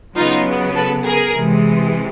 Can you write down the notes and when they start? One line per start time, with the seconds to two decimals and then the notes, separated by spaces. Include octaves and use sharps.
0.16 C#3 F#3 B3 D#4 F4
0.75 A4 B4
1.04 G#4 A#4
1.35 C3 E3 G#3